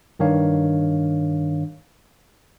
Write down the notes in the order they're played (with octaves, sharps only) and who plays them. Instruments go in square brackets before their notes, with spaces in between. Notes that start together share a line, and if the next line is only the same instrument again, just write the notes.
[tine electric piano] G2 D#3 D4 C#5 F5